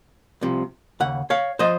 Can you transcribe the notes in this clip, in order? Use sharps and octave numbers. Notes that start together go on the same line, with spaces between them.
C2 C3 F3
D#2 C#3 F#5
C#5 F5
F3 C5 D#5